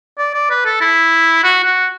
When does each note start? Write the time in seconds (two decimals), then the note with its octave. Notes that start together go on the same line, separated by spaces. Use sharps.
0.18 D5
0.34 D5
0.50 B4
0.66 A4
0.81 E4
1.44 F#4
1.64 F#4